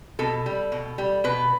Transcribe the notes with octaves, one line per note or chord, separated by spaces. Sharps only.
B2 A4
G3
B2
G3
B2 B4